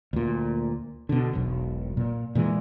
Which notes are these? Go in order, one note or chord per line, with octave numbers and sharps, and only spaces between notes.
D2 A#2
B2 D3
E1 B1
A#2
A#2 E3 G#3